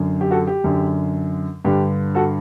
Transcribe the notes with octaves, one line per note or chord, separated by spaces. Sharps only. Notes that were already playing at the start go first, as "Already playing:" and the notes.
Already playing: F#2 D3
G4
F#4 A4
G4
F#2 D3
G2 D3 G4
F#4 A4